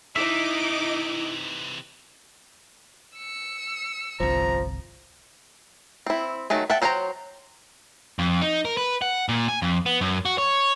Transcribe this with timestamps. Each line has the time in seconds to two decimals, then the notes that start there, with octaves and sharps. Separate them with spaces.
0.16 C3 E3 D#4 E4 D#5 E5 D6
3.17 E6 C#7
4.20 G1 C2 F3 A#5
6.06 C4 E4
6.50 D#3 F#3 A3 G#4
6.70 E5 F#5 G5 A5
6.82 F#3 C5 C#5 G5 A#5
8.19 F2
8.42 D#4
8.65 A#4
8.77 B4
9.02 F#5
9.29 A#2
9.48 G#5
9.62 F2
9.86 B3
10.01 F#2
10.26 F#4
10.38 C#5